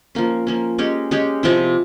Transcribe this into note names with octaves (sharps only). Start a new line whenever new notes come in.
F3 A#3 C#4
F3 A#3 C#4
G#3 C#4 G4 C#5
G#3 C#4 G4 C#5
C3 F3 C4 E4